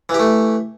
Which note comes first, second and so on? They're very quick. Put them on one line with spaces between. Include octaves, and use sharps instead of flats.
E3 G4 A3